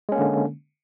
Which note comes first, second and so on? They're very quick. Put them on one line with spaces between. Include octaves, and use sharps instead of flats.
G#3 C#4 A#3 D3